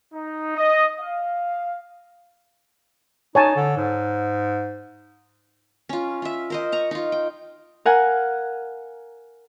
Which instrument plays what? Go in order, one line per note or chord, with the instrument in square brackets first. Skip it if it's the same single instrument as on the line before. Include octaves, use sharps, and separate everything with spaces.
[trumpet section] D#4
D#5
F5
[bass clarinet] D#4 [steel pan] C#5 G#5 A5
[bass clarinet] D3
G#2
[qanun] C#4 F4
F4 E5
A#4 C5 D#5
A#5 C#6
D#4 F4
G5
[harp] A#4 F5 F#5 G#5